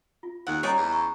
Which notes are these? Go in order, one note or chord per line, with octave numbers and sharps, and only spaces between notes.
F4
D#2 F#5 E6
G3 C#4 C#5 D#5 G#5 A#5
E2
A#5 C#6